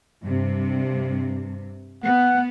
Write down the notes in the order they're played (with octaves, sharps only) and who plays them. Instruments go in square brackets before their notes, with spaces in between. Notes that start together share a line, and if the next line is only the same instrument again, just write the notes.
[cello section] G2 C3
[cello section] B3 [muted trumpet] F#5